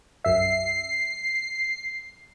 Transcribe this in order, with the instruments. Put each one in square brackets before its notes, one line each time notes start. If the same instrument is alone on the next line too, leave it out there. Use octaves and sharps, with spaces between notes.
[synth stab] B1 F#2 E5 [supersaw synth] C7